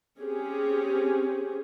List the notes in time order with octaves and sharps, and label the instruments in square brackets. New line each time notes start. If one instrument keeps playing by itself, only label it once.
[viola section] C4 C#4 G4 G#4